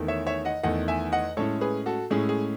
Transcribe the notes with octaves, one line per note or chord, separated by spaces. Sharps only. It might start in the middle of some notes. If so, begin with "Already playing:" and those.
Already playing: E2 D#3 A3
C#5 E5
C#5 E5
D#5 F#5
E2 D#3 A3 D#5 F#5
E5 G#5
D#5 F#5
A2 G#3 C#4 E4 A4 C#5
G#4 B4
F#4 A4
A2 G#3 C#4 E4 G#4
G#4